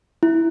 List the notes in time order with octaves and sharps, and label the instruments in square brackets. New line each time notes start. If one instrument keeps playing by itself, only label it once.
[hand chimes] E4